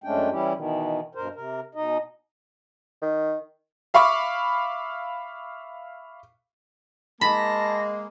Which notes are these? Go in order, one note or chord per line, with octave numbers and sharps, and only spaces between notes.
F#2 G#3 A3 C#4 D4 G5
E3 G3 C#4 E4 G4
B2 D#3 E3
G2 B2 A#4 C5
C3 A#4
B2 D#4 D#5
D#3
E5 F5 B5 C#6 D6
G#3 A#3 A5 B5 A#6